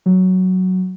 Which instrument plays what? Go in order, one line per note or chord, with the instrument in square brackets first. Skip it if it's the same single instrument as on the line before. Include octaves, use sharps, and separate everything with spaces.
[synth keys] F#3